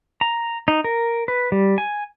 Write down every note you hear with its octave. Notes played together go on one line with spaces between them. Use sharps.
A#5
D#4
A#4
B4
G3
G#5